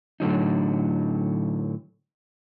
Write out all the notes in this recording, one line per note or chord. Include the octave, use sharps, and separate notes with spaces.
A2 D3 F#3 D#4